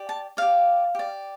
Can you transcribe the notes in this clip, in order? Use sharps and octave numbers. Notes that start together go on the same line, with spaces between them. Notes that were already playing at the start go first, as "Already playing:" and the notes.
Already playing: G4 D5
A5
G4 D5 F5
G4 D5